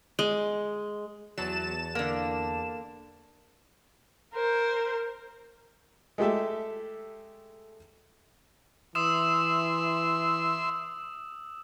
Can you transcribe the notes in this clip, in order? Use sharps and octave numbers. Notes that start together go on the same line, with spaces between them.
G#3
E2 F#3 A5 E7
D3 A#3
A#4 C5
G#3 A3 G4 A4 E5
E3 E5 C6 D#6 E6 E7